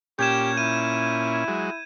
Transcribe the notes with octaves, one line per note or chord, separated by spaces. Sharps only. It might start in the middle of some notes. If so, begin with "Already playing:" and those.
A#2 C#4 G4 G6 G#6 E7
E4 D#7
F#3 G#3